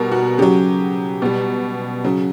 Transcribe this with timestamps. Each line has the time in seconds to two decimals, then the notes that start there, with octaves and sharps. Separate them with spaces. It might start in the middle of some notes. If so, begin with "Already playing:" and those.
Already playing: B2 G3 A#4
0.12 F#4
0.38 C#3 F#3 G4
1.22 B2 G3
2.04 C#3 F#3